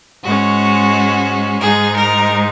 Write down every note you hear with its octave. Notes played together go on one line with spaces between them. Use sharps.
G#2 G#3 C#4 F#4
G#2 G#3 D#4 G#4
A#4